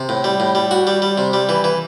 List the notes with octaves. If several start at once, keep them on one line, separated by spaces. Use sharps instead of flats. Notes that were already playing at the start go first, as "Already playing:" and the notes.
Already playing: C3
A2
G3
A2
G3
F#4
G3
G3
C3
G3
E3
E3